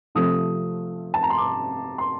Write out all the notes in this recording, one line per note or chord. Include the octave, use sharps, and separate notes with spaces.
C3 F3 A3 D#6
A5
A#5
C6
D6
C6